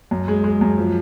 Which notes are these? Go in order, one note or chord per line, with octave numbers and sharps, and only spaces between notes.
F#2
G#3
G#3
F#2
F3